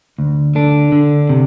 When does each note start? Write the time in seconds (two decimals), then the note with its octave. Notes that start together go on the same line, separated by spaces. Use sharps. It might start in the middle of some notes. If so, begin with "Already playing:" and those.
0.19 D2
0.55 D3 D4
0.92 D3
1.29 C3